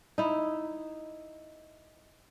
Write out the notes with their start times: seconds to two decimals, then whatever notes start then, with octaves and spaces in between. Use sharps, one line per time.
0.18 D#4 E4